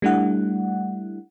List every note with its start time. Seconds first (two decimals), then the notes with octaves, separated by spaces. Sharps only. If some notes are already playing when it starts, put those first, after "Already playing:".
0.02 G3 A3 D4 E4 F#5